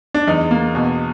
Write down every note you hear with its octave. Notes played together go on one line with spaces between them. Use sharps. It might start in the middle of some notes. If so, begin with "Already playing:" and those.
D4
E2 D#4
A#3
B2